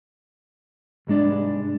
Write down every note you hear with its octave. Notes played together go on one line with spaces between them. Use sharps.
C2 G#2 G#3 D4 D5